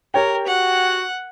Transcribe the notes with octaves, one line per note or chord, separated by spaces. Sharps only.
G4 A#4 C#5 G5
F#4 F#5